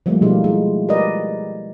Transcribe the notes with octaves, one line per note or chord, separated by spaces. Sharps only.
F3 G3 A3 A#3
B2 D#3 G#3 D#4 F4 G4
G#3 E4
G4 A#4 B4 D5 D#5